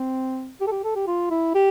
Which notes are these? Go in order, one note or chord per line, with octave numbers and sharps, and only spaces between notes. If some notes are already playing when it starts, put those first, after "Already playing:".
Already playing: C4
G4
A4
G4
A4
G4
F4
E4
G4